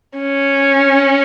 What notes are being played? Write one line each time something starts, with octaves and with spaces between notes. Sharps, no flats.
C#4